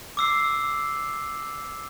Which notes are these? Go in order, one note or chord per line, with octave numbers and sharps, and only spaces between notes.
D6 E6 C7